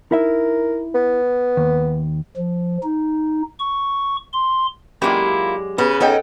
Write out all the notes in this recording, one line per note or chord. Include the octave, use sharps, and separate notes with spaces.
D#4 E4 A#4 E5
B3
D#2
F3
D#4
C#6
C6
F#2 G#3 A#3 E4 F4 G4 D5
C#3 B3
C#4 D#4 A4 D#5 F#5 G5